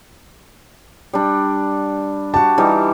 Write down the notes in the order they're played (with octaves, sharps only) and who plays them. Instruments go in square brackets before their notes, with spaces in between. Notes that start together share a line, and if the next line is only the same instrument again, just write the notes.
[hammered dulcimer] G3 D4
[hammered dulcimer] F#4 G4 [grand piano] A5
[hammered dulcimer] E3 G3 D#4